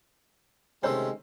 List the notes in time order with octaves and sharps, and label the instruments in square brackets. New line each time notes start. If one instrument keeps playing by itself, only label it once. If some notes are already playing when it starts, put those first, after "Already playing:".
[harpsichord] C3 A3 C#4 [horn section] D#3 G#3 [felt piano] C5